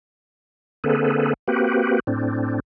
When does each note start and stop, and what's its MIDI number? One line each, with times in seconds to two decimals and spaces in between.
0.84 1.34 50
0.84 1.34 58
0.84 1.34 60
0.84 1.34 68
0.84 1.34 69
0.84 1.34 71
1.48 2.00 58
1.48 2.00 60
1.48 2.00 66
1.48 2.00 67
1.48 2.00 71
2.07 2.60 45
2.07 2.60 60
2.07 2.60 62